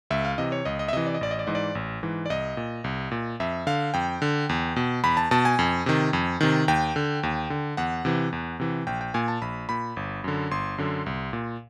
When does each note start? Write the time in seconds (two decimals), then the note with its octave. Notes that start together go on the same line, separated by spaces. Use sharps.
0.11 C#2 E5
0.25 F5
0.38 C3 E3 D#5
0.52 C#5
0.65 C#2 D#5
0.79 D#5
0.88 E5
0.93 C3 E3 D#5
1.06 D5
1.14 D#5
1.21 A1 D5
1.31 D#5
1.39 D5
1.47 G#2 E3 D#5
1.55 D5
1.75 A1
2.03 G#2 E3
2.26 D5
2.30 C2 D#5
2.57 A#2
2.84 C2
3.11 A#2
3.40 F2 E5
3.67 D3 F5
3.94 F2 G5
4.22 D3
4.49 E2
4.76 B2
5.04 E2 B5
5.17 A5
5.31 B2 A5
5.45 G#5
5.59 F2
5.86 C3 D#3
6.13 F2
6.41 C3 D#3
6.68 D#2 G5
6.96 D3
7.23 D#2
7.50 D3
7.77 E2 F#5
8.05 C3 E3
8.33 E2
8.60 C3 E3
8.87 A#1 G5
9.01 G5
9.14 A#2 G#5
9.28 A5
9.42 A#1 B5
9.69 A#2 B5
9.97 G1
10.24 F#2 D3
10.51 G1 C6
10.78 F#2 D3
11.06 C2
11.33 A#2